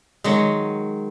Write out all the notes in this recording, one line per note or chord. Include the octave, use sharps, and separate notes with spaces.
D#3 F#3 G#3